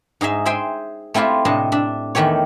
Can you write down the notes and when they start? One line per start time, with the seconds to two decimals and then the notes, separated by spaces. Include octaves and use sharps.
0.21 G#2 D#4 G#4 E5
0.45 G#4 C5 E5 G5 G#5
1.14 A3 C4 E4 F4 G4
1.45 A2 C3 D4 D#5 A5
1.72 D4 E5
2.15 E2 D#3 A3 G4 C#5